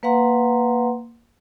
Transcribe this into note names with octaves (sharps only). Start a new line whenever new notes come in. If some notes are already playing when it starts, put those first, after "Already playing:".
A#3 B4 F5 F#5 A#5 C6